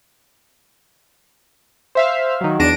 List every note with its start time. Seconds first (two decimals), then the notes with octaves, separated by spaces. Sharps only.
1.95 C5 E5 F5
2.41 D#3 F#3
2.59 E2 D4 A5 A#6 D7 D#7